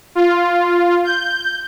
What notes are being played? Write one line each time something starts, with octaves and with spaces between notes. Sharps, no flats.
F4
G6